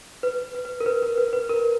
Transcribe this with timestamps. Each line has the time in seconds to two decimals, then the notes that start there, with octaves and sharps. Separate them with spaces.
0.23 B4
0.55 B4
0.65 B4
0.80 A#4
0.86 B4
1.02 A#4
1.17 B4
1.33 B4
1.49 A#4